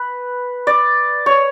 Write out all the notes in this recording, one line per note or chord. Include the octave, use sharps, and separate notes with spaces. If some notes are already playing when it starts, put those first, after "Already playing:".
Already playing: B4
D5
C#5